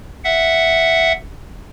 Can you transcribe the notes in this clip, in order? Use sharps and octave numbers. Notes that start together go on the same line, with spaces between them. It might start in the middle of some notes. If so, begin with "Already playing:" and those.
E5 F#5